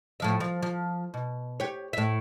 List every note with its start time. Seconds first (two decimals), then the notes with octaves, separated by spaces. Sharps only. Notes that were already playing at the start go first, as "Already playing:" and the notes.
0.20 A2 F3 E5
0.40 F3
0.63 F3
1.14 B2
1.60 G4 C#5
1.93 A2 E5